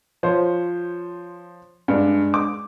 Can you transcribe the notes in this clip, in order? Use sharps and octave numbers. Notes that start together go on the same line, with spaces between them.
F3 C5 C#5
G2 G#3 D4
D6